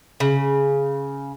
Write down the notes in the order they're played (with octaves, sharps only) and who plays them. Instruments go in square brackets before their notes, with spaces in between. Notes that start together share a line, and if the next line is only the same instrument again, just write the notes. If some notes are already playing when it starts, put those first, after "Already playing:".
[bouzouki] C#3